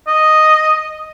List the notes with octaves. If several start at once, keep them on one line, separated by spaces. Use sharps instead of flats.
D#5